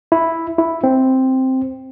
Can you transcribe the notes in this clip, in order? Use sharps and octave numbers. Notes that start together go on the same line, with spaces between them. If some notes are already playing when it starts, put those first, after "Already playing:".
E4
E4
C4